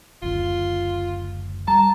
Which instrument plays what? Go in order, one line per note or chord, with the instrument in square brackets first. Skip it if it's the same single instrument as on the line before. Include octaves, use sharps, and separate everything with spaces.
[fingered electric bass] F#1 D2 [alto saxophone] F4
[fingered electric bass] G3 [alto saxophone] A5 [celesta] A#5